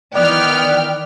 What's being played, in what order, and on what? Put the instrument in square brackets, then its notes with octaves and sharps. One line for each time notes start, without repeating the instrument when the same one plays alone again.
[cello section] D#3 E3 [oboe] B3 [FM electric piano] D5 [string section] G5 F6